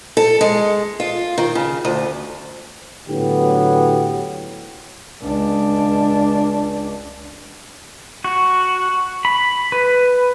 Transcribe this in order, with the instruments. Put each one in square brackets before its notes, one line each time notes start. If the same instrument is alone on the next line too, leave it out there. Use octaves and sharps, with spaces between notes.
[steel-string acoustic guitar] A4
G#3
F4
D#3
C#3
D2
[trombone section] A2 D3 F#3 B3 G4
[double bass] C#2 D4
[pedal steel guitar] F#4
B5
B4